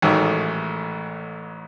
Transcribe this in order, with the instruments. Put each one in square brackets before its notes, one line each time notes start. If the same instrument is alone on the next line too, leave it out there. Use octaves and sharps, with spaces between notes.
[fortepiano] A1 G#2 D#3 F#3 A3